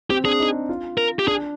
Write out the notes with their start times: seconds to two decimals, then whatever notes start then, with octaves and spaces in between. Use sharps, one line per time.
0.10 C4 G4
0.25 D4 G#4
0.40 D#4
0.69 F4
0.98 A#4
1.19 G4
1.27 D4 G#4